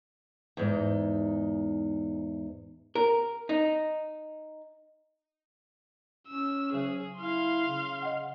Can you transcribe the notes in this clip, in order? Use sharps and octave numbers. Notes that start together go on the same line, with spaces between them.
E2 G#2 D#4
A#4
D#4
C#4 E6
C#3 F#3 G#4
E4 F5 C6
C#3
D#5 F#5